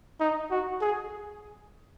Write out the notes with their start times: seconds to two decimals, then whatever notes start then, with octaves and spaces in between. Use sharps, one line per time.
0.20 D#4
0.51 F#4
0.81 G#4